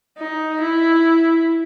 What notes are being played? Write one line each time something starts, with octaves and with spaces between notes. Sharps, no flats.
D#4
E4